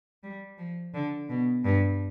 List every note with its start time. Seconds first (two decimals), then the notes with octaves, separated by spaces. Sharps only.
0.23 G3
0.58 F3
0.94 D3
1.29 B2
1.64 G2